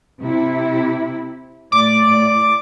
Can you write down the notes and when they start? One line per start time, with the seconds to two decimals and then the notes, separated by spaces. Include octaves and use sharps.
0.19 C3 E4
1.72 A2 D5 D6